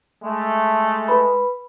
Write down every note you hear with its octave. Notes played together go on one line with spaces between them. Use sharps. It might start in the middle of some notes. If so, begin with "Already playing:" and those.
G#3 A3
B4 B5